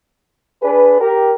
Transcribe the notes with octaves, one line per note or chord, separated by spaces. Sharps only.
D4 G#4 B4
G4 A#4